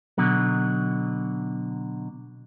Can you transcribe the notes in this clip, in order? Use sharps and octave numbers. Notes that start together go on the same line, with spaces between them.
B2 D3 F#3